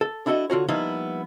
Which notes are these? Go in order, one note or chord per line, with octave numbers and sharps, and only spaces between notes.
A4
D4 E4 F#4 A4 D#5
D3 F4 F#4 C#5
F3 G3 A#3 B3 D#4 E4